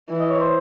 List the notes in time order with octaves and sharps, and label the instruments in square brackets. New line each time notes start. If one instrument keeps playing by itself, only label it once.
[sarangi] E3
[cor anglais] D#5
C#5
C5